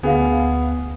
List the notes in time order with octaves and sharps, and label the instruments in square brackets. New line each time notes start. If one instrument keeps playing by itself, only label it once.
[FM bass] D2 [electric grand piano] B3 [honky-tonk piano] G#4 F5